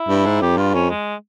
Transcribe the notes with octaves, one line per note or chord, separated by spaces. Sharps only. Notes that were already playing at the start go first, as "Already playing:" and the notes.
Already playing: E4
G2
G#2
F2 G4
G2 F4
F2 C#4
G#3